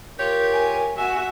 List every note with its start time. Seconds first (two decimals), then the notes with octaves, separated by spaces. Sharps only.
0.19 F4 G4 A#4 C#5 G6
0.53 G#5
0.97 F#4 E5 G#5